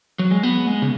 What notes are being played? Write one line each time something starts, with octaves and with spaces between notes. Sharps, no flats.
F#3
G#3
B3
G#3
C#3